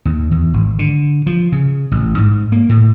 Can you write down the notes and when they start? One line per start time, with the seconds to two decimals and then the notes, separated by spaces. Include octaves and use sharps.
0.05 D#2
0.32 E2
0.54 G#1
0.79 D3
1.27 F3
1.52 C#3
1.91 A1
2.18 G#2
2.52 A#3
2.69 A2